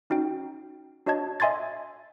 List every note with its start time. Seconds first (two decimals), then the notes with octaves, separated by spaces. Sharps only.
0.10 C#4 D#4 F#4 G5
1.06 D4 F#4 C#5 D#5 A5 G#6
1.40 D#5 E5 G#5 C6 G#6 A6